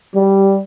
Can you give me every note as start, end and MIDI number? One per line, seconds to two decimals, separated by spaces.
0.16 0.60 55